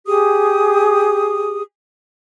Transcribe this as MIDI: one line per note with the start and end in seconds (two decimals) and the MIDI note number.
0.07 1.62 67
0.07 1.62 68
0.07 1.62 87